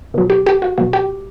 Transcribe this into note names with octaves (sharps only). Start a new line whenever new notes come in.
B2 F#3
G4
G4
F#4
B2 F#3 F#4
G4